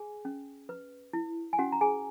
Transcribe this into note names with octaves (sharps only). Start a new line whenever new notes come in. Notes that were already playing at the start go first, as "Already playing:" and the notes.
Already playing: G#4 G#5
C#4
B4
E4
G#5
C#4 F#4 F#5
A#5
G#4 G#5